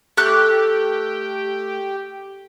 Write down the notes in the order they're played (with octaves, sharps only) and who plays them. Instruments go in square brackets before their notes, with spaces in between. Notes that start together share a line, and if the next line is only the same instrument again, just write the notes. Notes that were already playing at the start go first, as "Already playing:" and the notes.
[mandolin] A3 F#6 [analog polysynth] G4